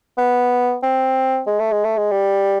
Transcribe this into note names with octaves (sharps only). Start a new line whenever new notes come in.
B3
C4
G#3
A3
G#3
A3
G#3
G3